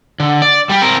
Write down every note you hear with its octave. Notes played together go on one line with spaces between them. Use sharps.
D3
D5
G3 G4
C4 A#4